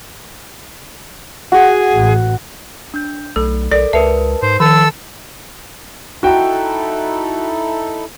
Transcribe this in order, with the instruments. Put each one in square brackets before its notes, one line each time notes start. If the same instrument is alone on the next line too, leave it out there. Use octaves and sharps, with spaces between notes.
[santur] F#4 [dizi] G#4 [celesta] F#5
[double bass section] A1
[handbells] D4 G6
[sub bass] B1 [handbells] A3 [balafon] A4
[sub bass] B1 [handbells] A4 A#4 [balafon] D5
[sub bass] C#2 [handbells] A#4 B4 A5 [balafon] E5
[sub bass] G#2 [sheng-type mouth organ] C5
[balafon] D#3 [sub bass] F3 [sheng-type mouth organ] A4 E6
[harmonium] D#4 E4 A4 [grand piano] F#4 G5